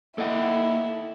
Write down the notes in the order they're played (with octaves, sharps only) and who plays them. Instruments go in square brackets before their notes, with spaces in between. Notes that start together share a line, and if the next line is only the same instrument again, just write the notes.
[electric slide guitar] A#3 G5 [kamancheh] E4 [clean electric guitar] A4 D#5 F#5